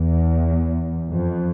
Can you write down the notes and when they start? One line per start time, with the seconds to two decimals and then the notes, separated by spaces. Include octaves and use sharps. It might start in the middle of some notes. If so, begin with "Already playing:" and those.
Already playing: E2
1.10 F2